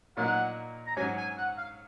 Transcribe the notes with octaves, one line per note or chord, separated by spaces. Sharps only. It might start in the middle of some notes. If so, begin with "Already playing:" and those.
A#2 F#3 A#3 D#4 A#4 F#5
A#5
G#2 F#3 C#4 G#5
G#5
F#5
F5